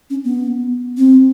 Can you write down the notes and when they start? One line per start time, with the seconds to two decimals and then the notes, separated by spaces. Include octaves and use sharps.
0.10 C#4
0.25 B3
0.97 C4